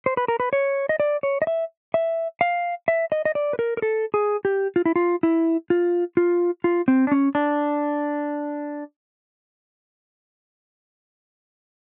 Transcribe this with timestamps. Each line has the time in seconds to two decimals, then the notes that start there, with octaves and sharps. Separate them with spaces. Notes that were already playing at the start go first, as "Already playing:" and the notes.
0.06 C5
0.17 B4
0.28 A#4
0.40 B4
0.53 C#5
0.89 D#5
1.00 D5
1.23 C#5
1.42 D#5
1.47 E5
1.94 E5
2.41 F5
2.88 E5
3.12 D#5
3.25 D#5
3.35 D5
3.53 B4
3.59 A#4
3.77 A#4
3.82 A4
4.14 G#4
4.45 G4
4.76 F4
4.85 E4
4.96 F4
5.23 E4
5.70 F4
6.17 F4
6.64 F4
6.88 C4
7.07 D4
7.12 C#4
7.35 D4